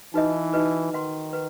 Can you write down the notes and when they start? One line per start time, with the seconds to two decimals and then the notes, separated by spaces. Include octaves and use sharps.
0.14 E3 D#4 F#4 B4 D#5
0.54 D#4 F#4 B4 D#5
0.93 D#3 B4 F#5 C6
1.33 B4 F#5